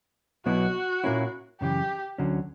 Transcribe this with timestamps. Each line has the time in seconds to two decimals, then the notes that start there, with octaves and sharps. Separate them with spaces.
0.46 B1 B2 F#3 B3 E4 F#4
1.04 A#2 A#3 C#4 E4
1.61 F#2 C#3 E3 G4
2.18 D2 D3 F#3 C#4